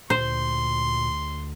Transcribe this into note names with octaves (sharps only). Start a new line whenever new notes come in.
D2 A#2 C5 C6